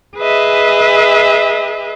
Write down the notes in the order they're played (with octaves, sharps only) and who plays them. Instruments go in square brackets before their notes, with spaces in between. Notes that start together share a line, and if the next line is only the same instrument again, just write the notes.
[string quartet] G#4 B4 D#5 E5